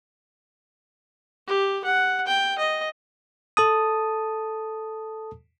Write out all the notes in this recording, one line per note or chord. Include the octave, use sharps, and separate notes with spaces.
G4
F#5
G5
D#5
A4 A5 D#6